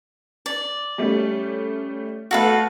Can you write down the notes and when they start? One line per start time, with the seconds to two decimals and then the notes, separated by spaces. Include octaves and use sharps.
0.46 D5
0.98 G3 A3 C#4
2.31 A3 F#4 A4 B4 F5 F#5